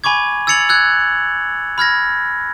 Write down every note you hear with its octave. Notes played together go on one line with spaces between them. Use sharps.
G#5 B5 C#6 D6 G#6
E6 G#6 A6 C#7 F7 F#7
E6 F#6 G#6
B5 F6 G#6 A#6